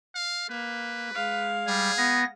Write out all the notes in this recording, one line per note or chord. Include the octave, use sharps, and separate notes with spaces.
F5
A#3 B4
G#3 F5
G3 G#4
B3 A#6